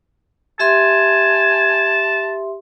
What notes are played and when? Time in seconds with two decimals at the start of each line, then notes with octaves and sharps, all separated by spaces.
0.60 G4 E5 G#5 A5 C6